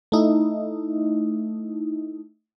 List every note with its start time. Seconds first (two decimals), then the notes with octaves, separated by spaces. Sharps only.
0.12 A3 D#4 E4